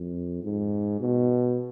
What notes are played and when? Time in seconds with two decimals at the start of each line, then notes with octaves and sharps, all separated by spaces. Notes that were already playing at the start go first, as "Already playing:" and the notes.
Already playing: F2
0.43 G#2
1.00 B2